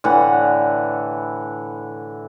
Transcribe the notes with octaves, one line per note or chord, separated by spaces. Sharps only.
A2 D3 E3 F#5